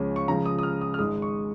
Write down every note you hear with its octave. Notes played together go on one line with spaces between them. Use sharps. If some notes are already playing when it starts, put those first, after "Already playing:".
Already playing: C#2 C#3 F3 C#4
C#6
C#2 C#3 F3 A#5
D#6
D#6
F6
D#6
F6
G#1 G#2 G#3 D#6
C#6